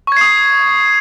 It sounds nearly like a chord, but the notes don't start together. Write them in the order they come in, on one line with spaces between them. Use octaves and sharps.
C#6 G#6 C7 D#6